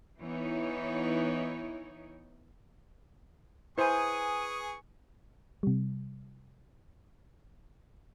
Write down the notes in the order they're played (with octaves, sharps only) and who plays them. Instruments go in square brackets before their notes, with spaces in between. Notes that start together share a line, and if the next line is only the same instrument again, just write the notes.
[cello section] E3 B3 D#4 E4 C#5
[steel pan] E4 C5 [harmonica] G#4 C#6 [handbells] B4 G#5 [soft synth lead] D#6
[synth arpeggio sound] C3 G3